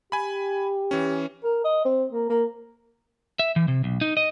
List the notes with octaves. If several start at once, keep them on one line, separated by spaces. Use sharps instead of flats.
G4 G#5 B5
E3 C#4
A#4
D#5
C4
A#3
A#3
E5
E3
C3
B1
D#4
D#5